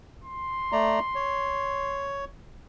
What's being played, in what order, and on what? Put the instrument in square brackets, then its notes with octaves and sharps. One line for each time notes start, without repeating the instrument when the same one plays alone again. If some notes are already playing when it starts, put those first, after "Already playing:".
[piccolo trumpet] C6
[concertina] A3 D5 A#5
C#5